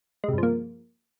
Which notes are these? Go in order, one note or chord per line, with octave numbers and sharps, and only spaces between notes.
G2 C3 F3 G#3 A#3